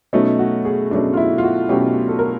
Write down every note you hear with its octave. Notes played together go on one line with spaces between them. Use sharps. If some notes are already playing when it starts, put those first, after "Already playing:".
B2 F#3 A3 C#4 D#4
F#4
G#4
B2 F#3 A3 C#4 D4
F4
E4
F4
F#4
B2 F#3 A3 C#4 G4
A4
A#4